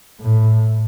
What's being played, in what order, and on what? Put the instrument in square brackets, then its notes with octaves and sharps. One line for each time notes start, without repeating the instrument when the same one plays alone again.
[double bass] A2